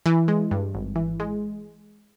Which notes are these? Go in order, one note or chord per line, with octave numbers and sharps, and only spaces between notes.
E3
G#3
G2
G#1
E3
G#3